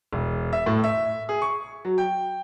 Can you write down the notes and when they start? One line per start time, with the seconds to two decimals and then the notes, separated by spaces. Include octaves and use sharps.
0.13 E1
0.53 E5
0.66 A2
0.84 E5
1.29 G#4
1.42 C#6
1.85 F#3
1.98 G5